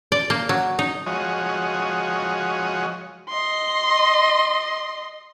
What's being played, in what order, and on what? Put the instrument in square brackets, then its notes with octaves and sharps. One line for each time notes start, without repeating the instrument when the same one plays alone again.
[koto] D5
A#3
F#3
D#4
[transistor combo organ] F3 G#3 F#4 C#5 D#5
[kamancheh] D#5 C6